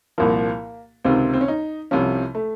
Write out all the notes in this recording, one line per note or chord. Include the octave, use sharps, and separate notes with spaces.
C2 A#2 F3 A#3
C#2 C3 D#3 C4
C4
C#4
D#4
C2 C3 F3 C#4
A3